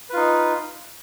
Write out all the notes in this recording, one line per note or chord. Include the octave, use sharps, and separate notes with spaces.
D#4 F4 B4